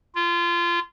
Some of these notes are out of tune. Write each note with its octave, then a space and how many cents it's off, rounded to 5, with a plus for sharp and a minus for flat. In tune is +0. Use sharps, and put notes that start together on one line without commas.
F4 -25